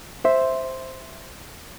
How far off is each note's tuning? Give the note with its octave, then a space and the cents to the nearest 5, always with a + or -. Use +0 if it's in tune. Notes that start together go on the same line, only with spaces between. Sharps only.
C5 +0 E5 +0